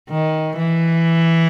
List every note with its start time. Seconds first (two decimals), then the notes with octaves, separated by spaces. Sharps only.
0.10 D#3
0.58 E3